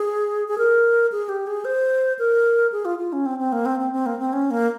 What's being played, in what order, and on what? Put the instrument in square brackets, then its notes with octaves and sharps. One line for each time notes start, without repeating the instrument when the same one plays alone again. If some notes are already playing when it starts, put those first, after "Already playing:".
Already playing: [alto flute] G#4
G#4
A#4
G#4
G4
G#4
C5
A#4
G#4
F4
F4
C#4
C4
C4
A#3
C4
C4
C4
A#3
C4
C#4
A#3